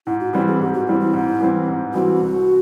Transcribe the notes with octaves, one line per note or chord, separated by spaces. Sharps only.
G#2 E4
F#4
E3 G3 C4 G4
G#4
G#2 G4
F#4
E3 G3 C4 E4
E4
G#2
E3 G3 C4
G#2
E3 G3 C4 F#4
C2